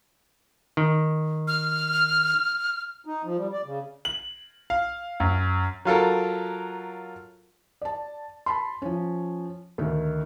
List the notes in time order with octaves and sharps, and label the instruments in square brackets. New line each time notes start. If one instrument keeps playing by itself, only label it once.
[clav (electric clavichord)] D#3
[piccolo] F6
[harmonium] D#4
F3
G3
D5
C#3
[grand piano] F#7
F5
F#2
[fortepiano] F#3 F4 A4 A#4
[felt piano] D5 A5
A5 B5 C6
F3 C#4
D2 D#3